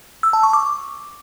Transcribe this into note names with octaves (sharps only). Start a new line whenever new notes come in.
E6
A5
C#6
D6